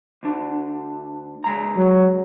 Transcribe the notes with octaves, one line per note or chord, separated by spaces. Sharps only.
D2 D4
C#3 G#3 A#5
F#3